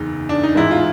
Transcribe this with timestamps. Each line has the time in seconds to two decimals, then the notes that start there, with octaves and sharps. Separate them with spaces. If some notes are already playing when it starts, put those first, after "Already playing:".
Already playing: F#1 E2 C#3 D#4
0.29 D4
0.43 D#4
0.55 A1 G#2 E3 E4
0.71 F4